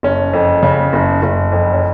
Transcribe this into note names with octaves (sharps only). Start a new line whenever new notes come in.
F#1 C#4
F2
C#3
F#1
F#1
F2
C#4